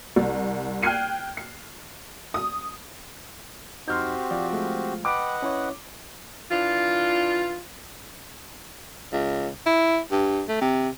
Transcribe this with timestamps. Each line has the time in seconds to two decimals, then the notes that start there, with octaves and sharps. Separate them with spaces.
0.16 C2
0.83 G5 F6 F#6 G#6 C7 D#7
1.37 C7
2.34 D#6
3.88 F2 C4 D#4 F#4 G4 C6 F6 G6
4.31 F3 D5
4.53 G#3 A3
5.05 B4 D#5 F#5 G5 B5 D6 D7
5.42 C#4 E4 C#5
6.51 E3 D4 F4
9.12 C#2
9.66 E4
10.11 G2
10.48 A3
10.61 C3